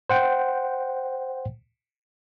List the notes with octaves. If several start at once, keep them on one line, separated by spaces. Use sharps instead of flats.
C5 F#5 G5